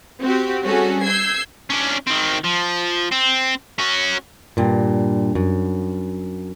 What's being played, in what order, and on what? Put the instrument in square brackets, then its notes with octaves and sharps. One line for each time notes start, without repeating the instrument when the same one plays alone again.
[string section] C4 F#4 G4
G3 C#4 F#4 G#4 A4
E6 G6 G#6 C7
[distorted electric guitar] C#4 D4
D#3 C4
F3
C4
C#4 F#4
[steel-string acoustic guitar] G2 A#2
F#2